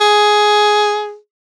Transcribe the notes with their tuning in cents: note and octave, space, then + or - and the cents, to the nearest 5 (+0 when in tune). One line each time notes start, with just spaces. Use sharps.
G#4 +10